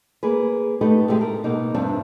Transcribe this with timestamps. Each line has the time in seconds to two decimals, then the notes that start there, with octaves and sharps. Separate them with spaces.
0.23 A#3 G#4 B4
0.81 A3 B3 D#4 G4 A4 B4
1.08 A2 C3 G#3 G4
1.21 A4 A#4
1.44 B2 A#3 D#4
1.75 E2 G2 C4 D4 A5